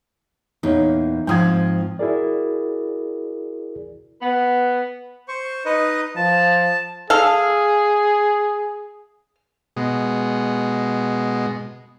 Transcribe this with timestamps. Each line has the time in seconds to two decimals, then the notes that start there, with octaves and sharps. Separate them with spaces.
0.63 E2 A#2 D#4 C#5
1.27 G#2 F3 C4 G5 D#6 G#6
1.99 E4 F#4 G#4 A#4 D5
4.22 B3
5.28 C5 C#6
5.65 D#4 B4 D#5
6.16 F3 A5
7.10 G#4 A4 F5
9.77 B2 G#3